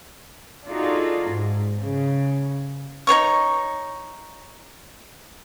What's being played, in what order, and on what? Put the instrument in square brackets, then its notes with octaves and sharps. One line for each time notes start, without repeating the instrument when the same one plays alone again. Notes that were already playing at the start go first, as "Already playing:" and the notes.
[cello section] D4 D#4 F4 F#4 G#4 A4
G#2
C#3
[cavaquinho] D#4 C5 C#5 C#6